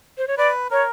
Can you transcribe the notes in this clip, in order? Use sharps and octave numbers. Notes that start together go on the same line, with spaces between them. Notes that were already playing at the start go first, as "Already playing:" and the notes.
C5
C#5
B4 D5
A#4 C#5